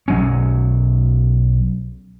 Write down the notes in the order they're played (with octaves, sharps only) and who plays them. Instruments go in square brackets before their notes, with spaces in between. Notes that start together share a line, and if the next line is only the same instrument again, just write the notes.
[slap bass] B1 F#3 C#4